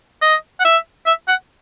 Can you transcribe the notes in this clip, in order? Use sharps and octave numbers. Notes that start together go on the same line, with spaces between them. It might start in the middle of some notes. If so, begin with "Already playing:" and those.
D#5
F#5
E5
E5
F#5